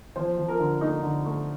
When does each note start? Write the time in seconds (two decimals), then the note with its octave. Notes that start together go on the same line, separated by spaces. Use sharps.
0.16 F3 C5
0.38 F3
0.48 A#4
0.60 D3
0.81 A3 D#4
1.03 D3
1.25 A3